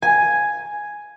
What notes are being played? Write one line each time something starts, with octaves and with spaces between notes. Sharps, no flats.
G#5